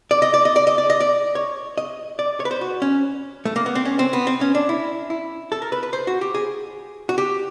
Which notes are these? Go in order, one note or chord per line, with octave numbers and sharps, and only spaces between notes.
D5
D#5
D5
D#5
D5
D#5
D5
D#5
D5
C#5
D#5
D5
C#5
B4
C5
F#4
C#4
A3
A#3
B3
C4
C#4
C4
B3
C4
C#4
D4
E4
E4
A4
A#4
B4
B4
C5
F#4
G4
G#4
F#4
G4